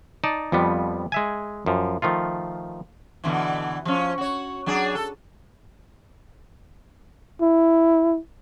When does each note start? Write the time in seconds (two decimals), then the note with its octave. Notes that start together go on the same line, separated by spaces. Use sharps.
0.24 D#4 D5 A5
0.52 F2 F3 G3 B3
1.12 G#3 E5 G#5
1.66 F#2 F3
2.02 D#3 F3 A3 F4
3.24 B2 D3 E3
3.85 F3 C#4
4.18 F#4 C#5
4.66 F#3 D4 G#4
4.95 A4
7.41 E4